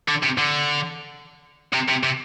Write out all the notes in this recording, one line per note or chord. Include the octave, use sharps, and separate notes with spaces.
D3
C3
D3
C3
C3
C3